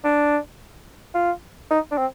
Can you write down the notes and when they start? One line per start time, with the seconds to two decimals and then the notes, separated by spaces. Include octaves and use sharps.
0.04 D4
1.14 F4
1.71 D#4
1.91 D4
1.98 C4